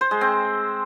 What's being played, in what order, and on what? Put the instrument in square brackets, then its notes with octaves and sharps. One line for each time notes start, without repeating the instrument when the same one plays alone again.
[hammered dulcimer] C5
G#3
C4